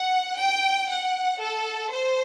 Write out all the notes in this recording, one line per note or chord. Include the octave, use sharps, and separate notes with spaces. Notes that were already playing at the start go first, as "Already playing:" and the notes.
Already playing: F#5
G5
F#5
A4
C5